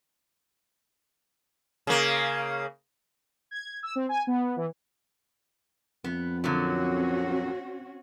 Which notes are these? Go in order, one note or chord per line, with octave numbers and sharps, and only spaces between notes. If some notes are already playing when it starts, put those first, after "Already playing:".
C#3 A#3
G#6
E6
C4
G#5
B3
E3
F2 B3
A#2 D3 F#3 C4 C#4 F#4